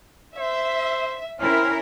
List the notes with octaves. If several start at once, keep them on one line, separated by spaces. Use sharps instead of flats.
C5 E5
C4 C#4 E4 A#4 F5